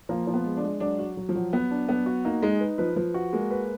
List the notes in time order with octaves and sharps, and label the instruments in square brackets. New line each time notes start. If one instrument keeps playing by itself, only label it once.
[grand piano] F3 [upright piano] A#3
[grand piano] F3
[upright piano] B3
[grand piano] G#3
[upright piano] D4
[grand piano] G#3
[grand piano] F#3 [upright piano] D4
[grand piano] F#4
F#3
[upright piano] F3
[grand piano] F#3
[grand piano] F#3 [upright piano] B3
[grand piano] D4
[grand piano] F#3 [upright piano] B3
[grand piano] F#4
[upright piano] A#3 [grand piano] D#4
[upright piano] G#3 [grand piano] D#4
[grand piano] B4
[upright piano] F3 [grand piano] B4
[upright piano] F3 [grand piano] B4
[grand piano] F#4
[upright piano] G#3 [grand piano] A#3
[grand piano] B4